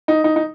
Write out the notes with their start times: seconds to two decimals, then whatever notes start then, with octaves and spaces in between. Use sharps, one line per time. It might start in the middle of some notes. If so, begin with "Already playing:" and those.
0.08 D#4
0.24 D#4
0.36 D#4